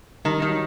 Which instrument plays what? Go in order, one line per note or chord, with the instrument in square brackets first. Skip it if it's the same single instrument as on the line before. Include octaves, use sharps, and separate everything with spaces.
[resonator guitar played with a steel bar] D#3 [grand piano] G3
[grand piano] G3
[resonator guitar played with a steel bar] D#3
[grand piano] F#3